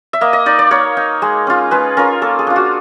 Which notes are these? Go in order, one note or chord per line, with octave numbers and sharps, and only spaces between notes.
E5
A#3 D#5
D#5
D#4 D5
D5
A#3 C#5
D#4
G#3
C#4 F4
G#3 B4
C#4 F4 A#4
A#3 A4
G#4
D4 F4
F#4